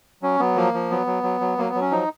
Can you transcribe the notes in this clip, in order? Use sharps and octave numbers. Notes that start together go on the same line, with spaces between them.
F#3 C#4
F#3 B3
F3 A#3
F3
F#3 B3
F#3
F#3
F#3
F#3 A#3
B3
F#3
C#4
F3 D#4